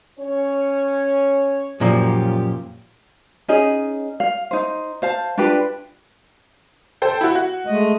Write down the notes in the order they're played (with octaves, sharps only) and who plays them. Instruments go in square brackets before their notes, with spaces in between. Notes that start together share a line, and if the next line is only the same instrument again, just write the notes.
[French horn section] C#4 C#5
[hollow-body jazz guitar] F#2 A#2 F3 [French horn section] F#3 F4 G4
[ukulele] C#4 D#4 G#4 D#5
F5
D#4 C5
C5 F5 A5
D4 F4 G4 B4
[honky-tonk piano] A4 C5 G5
E4 F#4
F#4
[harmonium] G#3 A3 D#5